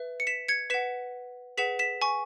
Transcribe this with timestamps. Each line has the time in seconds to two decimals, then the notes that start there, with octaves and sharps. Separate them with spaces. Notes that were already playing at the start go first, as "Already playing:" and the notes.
Already playing: B4 E5
0.20 C#7
0.27 B6 E7
0.48 G#6 C#7
0.70 B4 F#5 B6 E7
1.57 G#4 B4 F#5 B6 E7
1.79 B6 E7
2.02 G#5 C#6